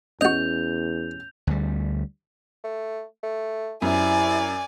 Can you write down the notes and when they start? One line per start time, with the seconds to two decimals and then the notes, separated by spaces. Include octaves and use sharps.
0.21 E2 C#4 F#4 D#5 G6 F7
1.47 D2 G3
2.64 A3
3.23 A3
3.82 F#2 C3 E4 D5 G#5